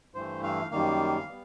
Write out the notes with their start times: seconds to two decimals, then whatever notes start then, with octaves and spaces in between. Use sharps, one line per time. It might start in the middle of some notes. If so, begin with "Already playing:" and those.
0.14 G2 E3 A3 C5
0.43 F5
0.71 F#2 D#3 G3 A#3 F5
1.28 G3 B3